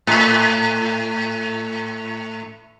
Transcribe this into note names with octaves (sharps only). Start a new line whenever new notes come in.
A2